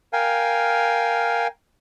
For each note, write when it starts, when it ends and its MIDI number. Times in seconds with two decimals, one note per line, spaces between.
0.13 1.47 70
0.13 1.47 77
0.13 1.47 79
0.13 1.47 80